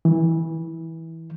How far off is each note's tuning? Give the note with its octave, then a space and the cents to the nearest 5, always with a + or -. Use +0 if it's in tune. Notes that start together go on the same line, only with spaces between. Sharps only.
E3 -15